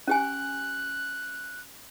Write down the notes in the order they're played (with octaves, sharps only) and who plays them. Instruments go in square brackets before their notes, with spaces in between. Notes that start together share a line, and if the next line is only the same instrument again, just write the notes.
[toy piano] C#4 G4 G#5 [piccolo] F#6